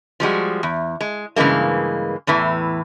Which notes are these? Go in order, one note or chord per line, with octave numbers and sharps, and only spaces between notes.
F3 G3 G#3 F#4
E2
G#3
G2 C#3 E3 G#3 A#3
E2 A2 E3